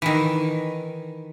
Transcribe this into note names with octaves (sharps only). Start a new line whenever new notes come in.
D#3 E3